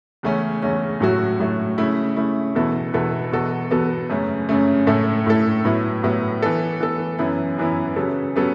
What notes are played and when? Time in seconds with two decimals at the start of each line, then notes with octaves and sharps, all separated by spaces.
0.23 E2 C#3 A3 C#4
0.62 E2 C#3 A3 C#4
1.00 A2 F#3 A3 F#4
1.39 A2 F#3 A3 F#4
1.78 C#3 A3 E4
2.16 C#3 A3 E4
2.55 E2 B2 B3 E4 A4
2.93 E2 B2 B3 E4 A4
3.32 E2 B2 B3 F#4 A4
3.71 E2 B2 B3 F#4 A4
4.10 F#2 C#3 A3
4.49 F#2 C#3 A3
4.87 A2 A3 E4 A4
5.27 A2 A3 E4 A4
5.65 A2 F#3 B3 E4
6.03 A2 F#3 B3 E4
6.42 E3 B3 A4
6.80 E3 B3 A4
7.19 F#2 E3 B3 E4
7.58 F#2 E3 B3 E4
7.96 C#3 F#3 B3 A4
8.36 C#3 F#3 B3 A4